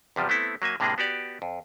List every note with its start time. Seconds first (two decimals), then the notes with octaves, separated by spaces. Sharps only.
0.16 E2 C3 F3 G3
0.29 A3 B3 C4 E4 A4
0.62 F#3 A#3 E5 G#5
0.80 A2 C3 G#3 A#3 D4 G#4
0.98 B3 F#4 G4 D5
1.42 F2